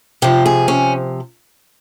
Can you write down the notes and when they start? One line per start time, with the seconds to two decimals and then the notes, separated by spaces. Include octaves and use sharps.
0.22 C3 F3 G4
0.46 G#4
0.68 C#4